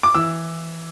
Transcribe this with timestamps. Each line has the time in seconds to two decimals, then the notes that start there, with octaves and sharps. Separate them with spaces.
0.03 D6
0.15 E3 E6